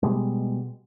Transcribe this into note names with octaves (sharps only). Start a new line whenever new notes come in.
B2 G3 G#3